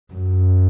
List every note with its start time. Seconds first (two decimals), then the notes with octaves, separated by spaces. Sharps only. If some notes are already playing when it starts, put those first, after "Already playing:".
0.13 F#2